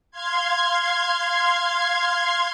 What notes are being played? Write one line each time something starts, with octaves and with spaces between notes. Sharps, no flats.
F5 C6 G#6